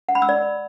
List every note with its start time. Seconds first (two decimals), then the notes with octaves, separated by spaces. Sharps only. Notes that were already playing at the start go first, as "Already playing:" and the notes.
0.09 F#5
0.15 B5
0.22 E6
0.29 D5